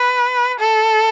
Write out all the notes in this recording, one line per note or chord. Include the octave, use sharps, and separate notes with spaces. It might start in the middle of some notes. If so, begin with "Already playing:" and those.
Already playing: B4
A4